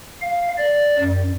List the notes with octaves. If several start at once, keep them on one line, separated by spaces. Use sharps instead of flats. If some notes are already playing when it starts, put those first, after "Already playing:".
F5
D5
F#2